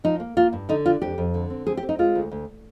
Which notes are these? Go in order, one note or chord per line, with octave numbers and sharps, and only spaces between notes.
F3 D#4
A#3
A#3 F4
G2
D3 D#4
D4 F4
F2 G4
F2
D3
C4
C4 G#4
G4
C4
D#4
G#3 F4
D2
D2